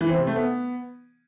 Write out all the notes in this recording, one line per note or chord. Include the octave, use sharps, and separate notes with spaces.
E3
C4
C3
A3
B3